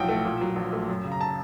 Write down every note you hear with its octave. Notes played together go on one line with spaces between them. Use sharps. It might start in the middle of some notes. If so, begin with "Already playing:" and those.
Already playing: B1 A2 F3 F#5 G5
A3
A#2
F#3
A#1
A3
F#2
C#3
A#5
A5